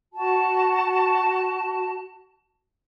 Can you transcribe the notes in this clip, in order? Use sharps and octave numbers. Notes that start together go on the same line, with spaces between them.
F#4 A5